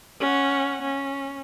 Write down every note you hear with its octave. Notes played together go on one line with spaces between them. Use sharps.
C#4 F#5
C#4